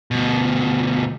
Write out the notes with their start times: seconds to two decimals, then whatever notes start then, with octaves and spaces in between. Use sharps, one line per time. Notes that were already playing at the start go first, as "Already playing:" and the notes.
0.11 D2 B2